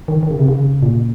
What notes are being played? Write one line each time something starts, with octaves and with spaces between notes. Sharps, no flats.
D#3
D#3
C#3
C3
C#3
A#2